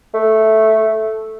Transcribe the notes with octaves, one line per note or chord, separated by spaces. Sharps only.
A3